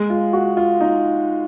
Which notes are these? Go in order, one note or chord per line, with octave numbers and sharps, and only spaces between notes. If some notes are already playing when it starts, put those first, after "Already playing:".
Already playing: G#3
F4
F#4
F4
D#4